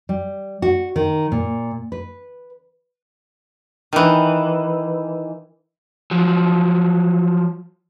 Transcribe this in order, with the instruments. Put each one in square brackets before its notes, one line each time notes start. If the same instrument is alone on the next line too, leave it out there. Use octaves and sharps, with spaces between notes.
[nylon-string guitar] G3
F#4
D#3
A#2
B4
[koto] D#3 E3
[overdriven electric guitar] F3 F#3